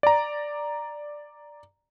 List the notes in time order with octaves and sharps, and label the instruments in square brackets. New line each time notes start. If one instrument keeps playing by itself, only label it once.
[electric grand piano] D5 A#5